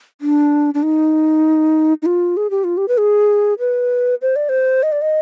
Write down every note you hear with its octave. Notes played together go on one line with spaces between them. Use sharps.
D4
D4
D#4
D#4
F4
G#4
G4
F4
G4
B4
G#4
B4
C5
D5
C5
D#5
D5
D#5